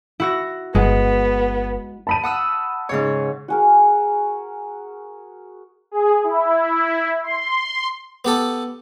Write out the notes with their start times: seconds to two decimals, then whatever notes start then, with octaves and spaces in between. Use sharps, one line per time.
0.20 E4 F#4 A#6
0.75 G1 G#3 B3
2.07 A5 B5 D#7
2.23 F#5 D#6 E6
2.89 G#2 C#3 C#5
3.48 F#4 G#4 A#4
5.91 G#4
6.24 E4
7.23 C6
8.25 B3 G4 A4